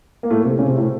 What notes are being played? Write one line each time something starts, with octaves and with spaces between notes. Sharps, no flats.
A#3
A2 A3
C3 C4
C#3 C#4
C3 C4
A2 A3